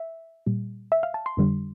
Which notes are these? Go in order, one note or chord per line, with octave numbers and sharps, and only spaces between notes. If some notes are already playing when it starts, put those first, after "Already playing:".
Already playing: E5
A#2 G3
E5
F5
A5
C6
F2 D3 G3